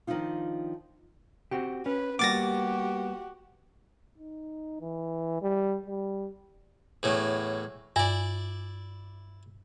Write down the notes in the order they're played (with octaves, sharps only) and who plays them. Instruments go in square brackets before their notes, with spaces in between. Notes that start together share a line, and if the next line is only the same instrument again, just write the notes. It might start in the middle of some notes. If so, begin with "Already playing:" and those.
[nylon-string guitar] D#3 F3 D4 D#4 F4
[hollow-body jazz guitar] C4 F#4 G4
[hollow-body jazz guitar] C#4 [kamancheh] B4
[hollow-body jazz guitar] G3 A#3 B3 [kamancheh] F#4 G4 [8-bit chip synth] D6 A6 A#6
[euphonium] D#4
E3
G3
G3
[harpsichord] E2 A2 F#3
[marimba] G2 [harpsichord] E4 D5